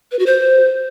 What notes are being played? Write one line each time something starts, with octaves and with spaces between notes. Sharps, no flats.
B4
F#4
C5